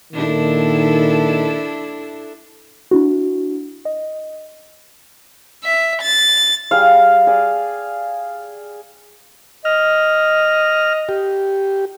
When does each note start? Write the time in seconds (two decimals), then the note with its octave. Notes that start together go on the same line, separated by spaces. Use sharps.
0.13 A#2 D#3 D4 E4 A4
2.91 D4 E4 F#4
3.85 D#5
5.64 E5
6.02 A6
6.71 G3 G#4 F5
7.27 G#4 D5
9.65 D#5 F6
11.09 G4